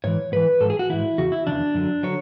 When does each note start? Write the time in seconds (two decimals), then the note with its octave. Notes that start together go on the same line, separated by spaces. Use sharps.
0.04 G#2 E3 C#5
0.32 G#2 E3 B4
0.60 G#2 E3 A4
0.70 G#4
0.79 F#4
0.90 G#2 E3 E4
1.18 E2 C#3 F#4
1.32 E4
1.46 E2 C#3 E3 D4
1.74 F#2 D3 F#3
2.03 D3 F#3 C#5